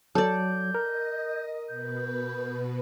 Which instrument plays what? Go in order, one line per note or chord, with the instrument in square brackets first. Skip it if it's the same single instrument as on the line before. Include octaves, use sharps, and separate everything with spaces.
[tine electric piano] F#3 [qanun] A4 D5 [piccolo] G6
[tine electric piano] A#4 [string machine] D#5
[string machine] B2 B4 [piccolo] G6